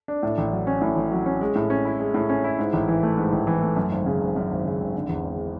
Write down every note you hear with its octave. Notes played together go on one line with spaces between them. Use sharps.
D4
A2
A1
F#3
C#4
A2
A1
F#3
C#4
G#3
A2
C#4
E4
G#3
A2
C#4
E4
G#2
A1
E3
A3
G#2
A1
E3
A3
F#2
G#1
C#3
G#1
F#2
G#1
C#3
G#1
D3
E2
G#3